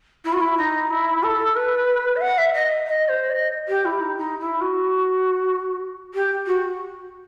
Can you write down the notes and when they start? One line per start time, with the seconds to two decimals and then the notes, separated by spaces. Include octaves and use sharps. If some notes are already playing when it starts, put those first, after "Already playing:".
0.24 E4
0.32 F#4
0.40 E4
0.57 D#4
0.90 E4
1.23 A4
1.55 B4
2.16 E5
2.21 F#5
2.38 E5
2.53 D#5
2.87 D#5
3.08 C5
3.30 D#5
3.68 G4
3.85 E4
4.01 D#4
4.17 D#4
4.39 E4
4.61 F#4
6.14 G4
6.47 F#4